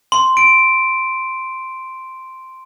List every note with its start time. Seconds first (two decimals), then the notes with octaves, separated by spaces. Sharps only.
0.12 C6
0.37 D7